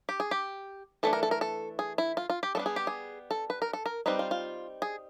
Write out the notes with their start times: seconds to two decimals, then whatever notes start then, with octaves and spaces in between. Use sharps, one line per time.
0.09 G4
0.20 G#4
0.31 G4
1.03 E3 A3 D4 A4
1.13 A#4
1.23 A4
1.31 A#4
1.41 A4
1.79 G#4
1.98 E4
2.17 F4
2.30 F4
2.43 G4
2.55 G3 B3 D4 A4
2.66 G#4
2.76 G4
2.87 G#4
3.31 A4
3.50 B4
3.62 A#4
3.73 A4
3.86 A#4
4.06 G3 C4 D#4 B4
4.19 F4
4.31 F4
4.82 G#4